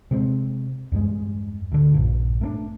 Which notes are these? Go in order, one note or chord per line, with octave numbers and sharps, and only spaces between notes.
C3 G#3 B3 C4
E2 G2 G3 G#3
D2 D3
A#1 G2 A#2
A3 A#3 D4